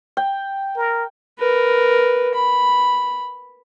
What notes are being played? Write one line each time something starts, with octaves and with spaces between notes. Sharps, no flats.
G5
A#4
A#4 B4
B5